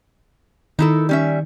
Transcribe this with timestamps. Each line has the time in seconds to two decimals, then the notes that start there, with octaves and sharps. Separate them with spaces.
0.79 D#3 D#4 E4 A4
1.09 G3 C#4 E5